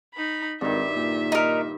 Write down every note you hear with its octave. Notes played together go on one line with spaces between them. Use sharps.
D#4 B5
G#1 G2 D#3 E5
A#2
D#4 A#4